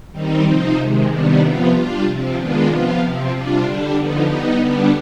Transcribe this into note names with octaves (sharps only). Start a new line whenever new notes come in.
D#3 G3 C4 D#4
C3 F3 C4 D#4
C3 D#3 G#3
C3 D#3 G3 B3 D4
C3 F3 B3 F4
G3 D4 F4
C3 F3 C4
D#3 G#3 B3 D4 F4
C3 F3 B3 F4
C3 F3 C4
C3 G3 D4 F4
D3 G3 D4
D3 F3 B3 D#4
G3 B3 D#4
D3 G3 B3 D4